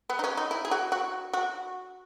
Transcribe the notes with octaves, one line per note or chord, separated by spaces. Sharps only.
B3
D#4
C#4
D#4
E4
G#4
F#4
F#4
F#4